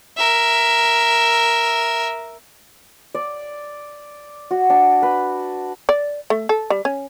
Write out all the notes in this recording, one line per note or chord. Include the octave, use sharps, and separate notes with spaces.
A#4 E5
D5
F#4
D4
B4
D5
A3
A4
G3
C#4